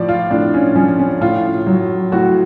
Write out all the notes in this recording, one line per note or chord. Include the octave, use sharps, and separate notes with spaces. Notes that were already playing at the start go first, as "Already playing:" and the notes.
Already playing: A2 F3 D5
F4
A2 D4
C#4
F3 C#4
C#4
A2 F4
F#3
A2 F#4